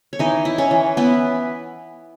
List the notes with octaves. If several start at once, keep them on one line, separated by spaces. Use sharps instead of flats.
C#5
E3 D#4 D#5
E4
C#4 C#5
E3
B3 E4 B4